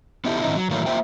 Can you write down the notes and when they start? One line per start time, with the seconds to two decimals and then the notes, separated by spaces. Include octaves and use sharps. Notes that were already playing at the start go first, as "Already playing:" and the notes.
0.25 B3 D#4 E4 G4 A4
0.41 G#2 D3 D#3 C4 D#4 E4
0.56 F#3
0.70 A2 D#3 E3 F#3 A3 A#3
0.86 A#3 F4 C5 E5 G5